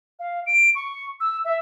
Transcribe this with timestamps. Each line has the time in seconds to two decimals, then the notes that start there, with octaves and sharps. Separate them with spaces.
0.19 F5
0.47 D7
0.75 C#6
1.20 E6
1.45 E5